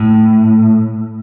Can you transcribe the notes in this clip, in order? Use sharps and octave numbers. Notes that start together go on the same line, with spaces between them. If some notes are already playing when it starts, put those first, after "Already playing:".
Already playing: A2